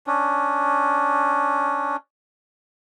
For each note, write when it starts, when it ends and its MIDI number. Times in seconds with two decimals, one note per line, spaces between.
0.07 1.96 61
0.07 1.96 62